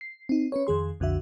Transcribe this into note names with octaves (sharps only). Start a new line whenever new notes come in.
C7
C4 D#4
C#4 B4 C#5
F2 D#3 G#4 C6
B1 F2 D3 F#4 E5